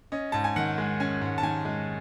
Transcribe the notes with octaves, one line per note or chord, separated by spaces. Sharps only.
C#4 D#5
G#2 A5
G#5
D#3 F#5
G#3
C#4 G#5
G#2
A5
D#3 G#5
G#3